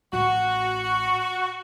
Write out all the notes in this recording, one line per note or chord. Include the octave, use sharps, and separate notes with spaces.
A1 F#4